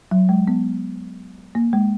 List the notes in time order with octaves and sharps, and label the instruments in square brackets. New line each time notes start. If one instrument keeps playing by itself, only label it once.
[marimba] F#3
G#3
B3
A#3
G#3